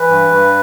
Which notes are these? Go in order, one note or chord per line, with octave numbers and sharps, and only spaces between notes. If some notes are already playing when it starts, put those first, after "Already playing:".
Already playing: E3 B4
G2
G2